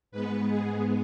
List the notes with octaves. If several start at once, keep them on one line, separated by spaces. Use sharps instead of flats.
G#2 G#3 B3 B4
G#4